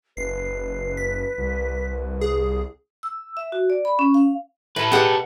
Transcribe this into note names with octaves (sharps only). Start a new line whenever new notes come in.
F#1 B4 C7
B6
C2
G#4
E6
E5
F#4
D5
B5
C#4
F5
A2 A4 B4
B2 G4 G#4 F#5